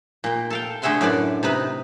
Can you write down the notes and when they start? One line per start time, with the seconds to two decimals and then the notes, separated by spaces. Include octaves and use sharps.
0.24 A#2 G5
0.50 A4 F5 G5
0.82 D3 A3 G#4 E5 F#5 C6
1.01 F#2 A2 B4 D5
1.43 C3 D#4 B4